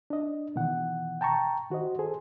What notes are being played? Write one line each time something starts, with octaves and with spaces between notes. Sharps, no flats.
D4 D#5
B2 D#3 E3 F#5
G5 A5 A#5 C#6
D#3 F#4 C5 D#5
G#4 A4 C5